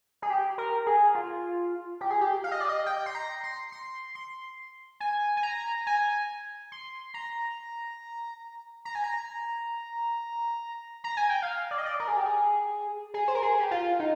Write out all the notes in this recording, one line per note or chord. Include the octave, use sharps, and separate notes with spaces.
G#4
G4
A#4
G#4
F4
G4
G#4
G4
F5
D#5
D5
D#5
G5
C6
A#5
C6
C6
C6
G#5
G#5
A#5
G#5
C6
A#5
A#5
G#5
A#5
A#5
G#5
G5
F5
D5
D#5
D5
A#4
G#4
G4
G#4
G#4
C5
A#4
G#4
G4
F4
D#4